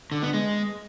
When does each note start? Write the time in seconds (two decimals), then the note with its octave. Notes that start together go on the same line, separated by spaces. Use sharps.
0.12 D3
0.23 B3
0.34 G#3